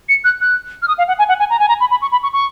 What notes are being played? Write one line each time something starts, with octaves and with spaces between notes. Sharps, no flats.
C#7
F#6
F#6
F6
D#6
F5
F#5
G#5
F#5
G#5
A#5
G#5
A#5
B5
B5
C#6
B5
C#6
C#6